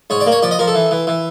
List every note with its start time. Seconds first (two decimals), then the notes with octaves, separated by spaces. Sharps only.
0.10 G#2 C#5
0.20 D5
0.26 A#3
0.32 C#5
0.43 F3 D5
0.51 D#5
0.59 F3 A#4
0.67 A4
0.75 E3
0.91 E3
1.07 E3